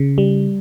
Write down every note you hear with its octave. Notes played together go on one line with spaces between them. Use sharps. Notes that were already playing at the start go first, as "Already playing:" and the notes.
Already playing: C#3
G3